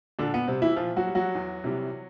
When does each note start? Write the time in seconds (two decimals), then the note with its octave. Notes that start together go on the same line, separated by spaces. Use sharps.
0.19 A#2 D3 D4
0.34 B3
0.48 C3 G3 C4
0.62 E3 E4
0.76 A#2 F3 F4
0.96 F#3 F#4
1.06 G3
1.15 F#3 F#4
1.35 E2
1.64 C3 E3 G3